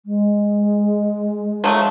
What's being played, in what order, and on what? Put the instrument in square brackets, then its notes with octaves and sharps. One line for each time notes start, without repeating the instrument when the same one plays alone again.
[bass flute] G#3
[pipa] F3 F#3 A3